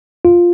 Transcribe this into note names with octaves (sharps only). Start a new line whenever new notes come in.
F4